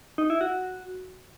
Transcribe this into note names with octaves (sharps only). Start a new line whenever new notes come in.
D#4
E4
F#4